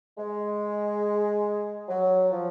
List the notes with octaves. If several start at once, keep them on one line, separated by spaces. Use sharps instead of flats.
G#3
F#3
F3